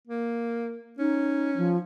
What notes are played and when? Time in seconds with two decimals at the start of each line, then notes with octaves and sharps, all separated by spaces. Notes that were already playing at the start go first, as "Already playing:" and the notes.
0.08 A#3
0.99 C#4 D#4
1.57 F3